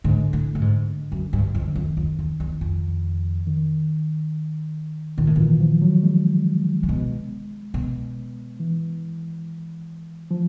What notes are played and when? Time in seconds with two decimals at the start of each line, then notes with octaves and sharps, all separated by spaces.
0.04 G#2 D3
0.33 A2
0.55 A2
0.61 G#2
1.12 F#2
1.33 G2
1.55 F2
1.67 D3
1.75 F2 D#3
1.97 F2
2.19 E2
2.40 E2
2.61 F2
3.47 D#3
5.18 A#2 D#3
5.27 A2
5.36 A#2 E3
5.60 F3
5.82 F#3
6.03 G#3
6.83 A#2
6.89 B2
7.74 B2
8.60 E3
10.31 F3